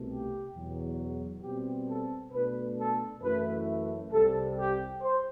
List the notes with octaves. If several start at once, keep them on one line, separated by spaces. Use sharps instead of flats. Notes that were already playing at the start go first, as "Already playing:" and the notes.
Already playing: C2 B2 A3
G4
E2 B2 F#3
B2 G3 C4 G4
A4
B2 A3 D4 B4
A4
F#2 E3 A3 E4 B4
C2 C3 G3 A4
G4
C5